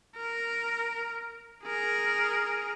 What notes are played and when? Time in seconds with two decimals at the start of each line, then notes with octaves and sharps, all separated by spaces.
0.16 A#4
1.64 G#4 A#4